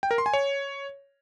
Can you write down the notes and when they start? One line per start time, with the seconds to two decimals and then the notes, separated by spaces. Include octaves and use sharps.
0.03 G5
0.11 A#4
0.18 C6
0.26 G#5
0.34 C#5